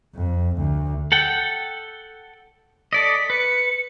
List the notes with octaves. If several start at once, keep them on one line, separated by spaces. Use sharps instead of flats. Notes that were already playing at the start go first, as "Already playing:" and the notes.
F2
D2
A4 F#5 G5
A4 D5 D#5 B6
B4 C#7